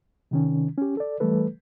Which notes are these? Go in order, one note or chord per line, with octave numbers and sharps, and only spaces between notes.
C3 D#3 C#4
C#4 G4
A4 D5
E3 G3 A3 A4 B4